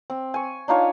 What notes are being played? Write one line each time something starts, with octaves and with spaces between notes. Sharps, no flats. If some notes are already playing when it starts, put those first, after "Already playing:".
C4
G#5 C#6
D4 D#4 F4 C#5